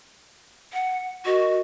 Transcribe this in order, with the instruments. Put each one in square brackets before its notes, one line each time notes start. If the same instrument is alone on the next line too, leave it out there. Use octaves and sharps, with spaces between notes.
[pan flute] F#5
[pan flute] F#4 [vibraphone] A#4 D#5 C#6